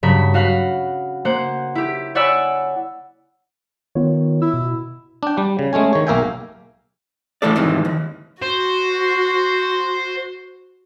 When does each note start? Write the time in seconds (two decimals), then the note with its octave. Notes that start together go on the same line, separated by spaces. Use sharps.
0.03 G2 C#3 F#3 A#4 B5
0.34 F#4 F5 F#5 B5
1.25 A#3 C5 F#5
1.75 E4 G4
2.15 C#5 D5 F#5 G#5 B5 E6
3.95 D#3 B3 F4 C#5
4.42 E4 E6
4.54 B2
5.23 D4 G5
5.38 G3
5.59 C#3
5.73 G#3 A3 C#4 G#5
5.93 D#3 C#5
6.07 B1 A#3 A#4 E5 G5 G#5
7.42 A2 E3 A3 A4 D5
7.56 F2 G#2 C3 D#3 E3
7.85 D#2
8.42 F#4 C5